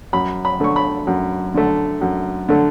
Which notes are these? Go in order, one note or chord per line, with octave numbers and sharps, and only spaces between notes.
F#2 B5
B5
D3 A3 C#6
B5
F#2
D3 A3
F#2
D3 A3